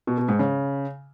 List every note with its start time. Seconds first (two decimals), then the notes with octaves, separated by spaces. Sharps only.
0.07 B2
0.18 B2
0.29 G#2
0.39 C#3